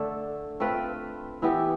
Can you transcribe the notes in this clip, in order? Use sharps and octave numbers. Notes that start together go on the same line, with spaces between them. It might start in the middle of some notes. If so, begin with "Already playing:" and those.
Already playing: D3 A3 D4 A4
A3 C4 F4 B4
E3 B3 E4 G4